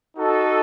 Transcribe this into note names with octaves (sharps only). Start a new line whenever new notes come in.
D#4 F#4 A4